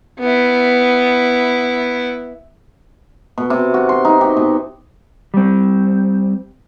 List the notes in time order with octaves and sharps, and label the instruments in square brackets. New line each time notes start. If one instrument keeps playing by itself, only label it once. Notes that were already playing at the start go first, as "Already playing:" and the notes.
[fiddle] B3 E4
[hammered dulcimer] B2
C3
F#4
C6
D#4
G4
B2
[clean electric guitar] G3 C4